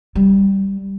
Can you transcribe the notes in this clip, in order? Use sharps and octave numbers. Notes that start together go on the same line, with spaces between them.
G3